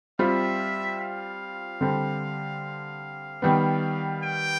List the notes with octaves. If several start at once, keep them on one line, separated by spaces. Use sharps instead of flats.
G3 C4 F4 E5
F5
D3 G3 C4
D#3 G3 B3
G5